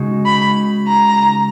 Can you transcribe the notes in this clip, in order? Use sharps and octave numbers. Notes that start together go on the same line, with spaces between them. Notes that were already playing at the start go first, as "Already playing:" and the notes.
Already playing: C#3 G#3 D#4 F#4
B5
A#5